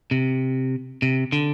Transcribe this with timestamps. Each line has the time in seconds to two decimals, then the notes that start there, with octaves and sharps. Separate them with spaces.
0.11 C3
1.02 C3
1.32 D3